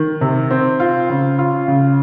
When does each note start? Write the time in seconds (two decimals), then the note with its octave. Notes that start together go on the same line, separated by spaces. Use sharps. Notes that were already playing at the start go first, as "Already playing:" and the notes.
Already playing: D#3
0.21 C3
0.51 C4
0.80 F4
1.10 C#3
1.39 F4
1.68 C#3